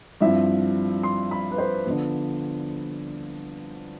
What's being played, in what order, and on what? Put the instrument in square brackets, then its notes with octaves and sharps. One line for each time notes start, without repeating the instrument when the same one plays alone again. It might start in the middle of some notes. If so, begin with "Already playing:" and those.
[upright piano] G2 F3 C4 E4 E5
C6
B5
B4
C5
D3 F3 B3